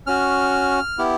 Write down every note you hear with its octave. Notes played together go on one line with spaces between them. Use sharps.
C#4 F#4 F6
B3 E4 G4